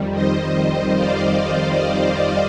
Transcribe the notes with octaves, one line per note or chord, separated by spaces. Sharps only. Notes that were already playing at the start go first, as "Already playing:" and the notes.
Already playing: F2 D#3 G3
C5 D#5
D5 F5
C5 D#5